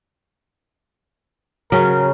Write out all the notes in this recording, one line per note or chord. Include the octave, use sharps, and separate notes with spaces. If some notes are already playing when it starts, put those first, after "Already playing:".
C#3 F#3 A#4